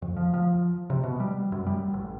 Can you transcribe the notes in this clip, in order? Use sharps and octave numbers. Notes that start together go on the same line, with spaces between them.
F2
F3
F3
C3
B2
G3
F#2
G3
A1